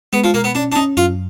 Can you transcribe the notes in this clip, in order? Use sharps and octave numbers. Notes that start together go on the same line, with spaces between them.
G#3 B3
F3
B2 A#3
B3
C#4 D4
D4
C#4 D#4
F#2 F4